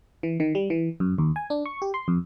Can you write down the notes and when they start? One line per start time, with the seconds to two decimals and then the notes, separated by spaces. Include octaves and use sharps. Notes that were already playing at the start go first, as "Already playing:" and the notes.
0.23 E3
0.40 D#3
0.55 G3
0.70 E3
1.00 F#2
1.18 D#2
1.36 G#5
1.50 D4
1.66 C#6
1.82 G4
1.94 C6
2.08 F2